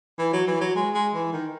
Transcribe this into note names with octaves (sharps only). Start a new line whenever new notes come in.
E3
F#3
E3
F#3
G#3
G#3
E3
D#3